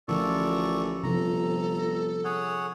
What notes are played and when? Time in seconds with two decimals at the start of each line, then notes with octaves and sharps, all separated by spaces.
0.08 A1 D3 F3 F4 A4 A#4 D5 C#6
1.03 G1 C3 F3 A4 A#5
2.24 G#4 C#5 F#5